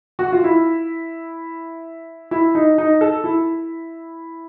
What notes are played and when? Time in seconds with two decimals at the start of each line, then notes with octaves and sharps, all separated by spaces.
0.19 F#4
0.32 F4
0.44 E4
2.31 E4
2.55 D#4
2.78 D#4
3.01 A4
3.24 E4